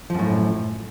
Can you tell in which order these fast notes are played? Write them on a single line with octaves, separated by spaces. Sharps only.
F3 F#2 A2